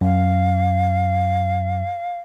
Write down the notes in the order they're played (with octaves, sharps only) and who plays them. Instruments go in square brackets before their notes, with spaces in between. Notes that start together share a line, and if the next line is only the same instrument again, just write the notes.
[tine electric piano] F#2 [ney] F5